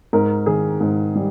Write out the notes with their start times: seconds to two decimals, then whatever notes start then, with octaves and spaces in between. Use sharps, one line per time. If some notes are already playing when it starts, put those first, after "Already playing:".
0.13 G#2 A#4
0.46 D#3 G#4
0.81 G#2
1.15 G3